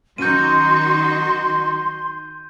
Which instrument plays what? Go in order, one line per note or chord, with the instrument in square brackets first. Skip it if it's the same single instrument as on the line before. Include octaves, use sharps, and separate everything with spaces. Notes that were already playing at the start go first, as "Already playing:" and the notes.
[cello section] D#3 D#4 F#4 [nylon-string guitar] F#3 C#4 [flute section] C6 [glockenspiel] G6 D#7